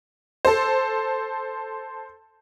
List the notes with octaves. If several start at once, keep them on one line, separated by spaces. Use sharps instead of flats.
A4 C5